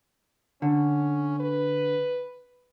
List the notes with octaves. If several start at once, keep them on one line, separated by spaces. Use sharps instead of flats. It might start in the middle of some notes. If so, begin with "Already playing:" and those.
D3 C#4
B4